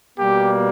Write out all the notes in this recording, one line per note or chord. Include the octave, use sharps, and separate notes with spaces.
B2 G3 A#3 G4